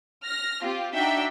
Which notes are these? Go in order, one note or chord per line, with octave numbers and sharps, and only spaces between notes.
F6 A#6
C4 F4 G4
D4 D#4 F#4 E5 G5